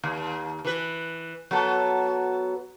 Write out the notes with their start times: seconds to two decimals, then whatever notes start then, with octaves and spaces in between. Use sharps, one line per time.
0.04 D#2
0.65 E3 B4
1.51 F#3 B3 A4